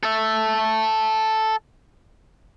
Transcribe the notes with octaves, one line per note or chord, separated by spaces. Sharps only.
A4 E5